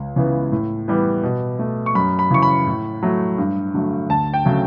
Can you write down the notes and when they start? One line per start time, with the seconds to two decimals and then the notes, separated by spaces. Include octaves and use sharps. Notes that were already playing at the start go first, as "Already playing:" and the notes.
Already playing: C#2
0.16 C#3 E3 B3
0.52 A2
0.88 E3 G3 B3
1.23 B2
1.59 A3
1.86 C#6
1.95 F#2 B5
2.19 B5
2.31 C#3 E3 C#6
2.42 B5
2.67 A2
3.03 F#3 A3
3.38 G2
3.74 D3 F#3 A3
4.10 D2 A5
4.34 G5
4.46 C#3 F#3 A3